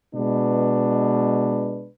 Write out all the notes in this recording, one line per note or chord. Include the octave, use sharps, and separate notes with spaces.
B2 G#3 D4 B4